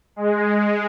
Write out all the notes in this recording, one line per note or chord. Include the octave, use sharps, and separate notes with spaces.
G#3